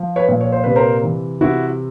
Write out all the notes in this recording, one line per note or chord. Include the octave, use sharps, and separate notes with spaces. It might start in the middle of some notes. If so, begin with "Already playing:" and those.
Already playing: F3
B4 C#5
A#2
C#5
C5
C3 B4
A#4 C5
E3
C3 E4 F#4